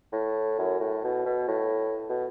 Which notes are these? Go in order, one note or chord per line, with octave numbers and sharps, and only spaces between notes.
A2
F#2
A2
B2
B2
A2
B2